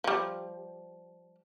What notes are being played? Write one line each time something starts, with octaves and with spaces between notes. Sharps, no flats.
F3 G3